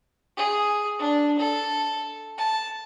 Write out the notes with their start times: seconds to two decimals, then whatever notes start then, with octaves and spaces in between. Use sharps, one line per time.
0.37 G#4
0.99 D4
1.39 A4
2.38 A5